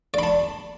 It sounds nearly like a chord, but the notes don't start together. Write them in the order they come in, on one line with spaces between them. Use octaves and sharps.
D5 B5 A5